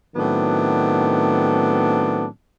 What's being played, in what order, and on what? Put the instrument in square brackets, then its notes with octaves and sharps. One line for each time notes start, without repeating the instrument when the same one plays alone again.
[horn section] A2 D#3 F#3 B3 C4 D4